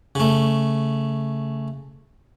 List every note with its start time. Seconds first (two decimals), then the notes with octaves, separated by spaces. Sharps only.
0.15 C#3 A3